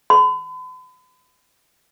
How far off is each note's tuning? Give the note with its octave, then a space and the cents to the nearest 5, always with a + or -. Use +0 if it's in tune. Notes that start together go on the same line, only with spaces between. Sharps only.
B5 +45